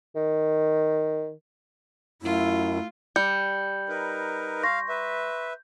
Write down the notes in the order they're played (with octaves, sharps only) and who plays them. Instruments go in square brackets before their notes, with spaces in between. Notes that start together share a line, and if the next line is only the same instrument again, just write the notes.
[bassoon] D#3
[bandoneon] F#2 [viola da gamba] A3 F4 [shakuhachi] E4
[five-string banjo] G3 [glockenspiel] G6 [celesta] C#7
[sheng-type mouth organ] D#4 A#4 B4
[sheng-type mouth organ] F5 [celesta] C6 C#6 A#6
[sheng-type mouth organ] B4 E5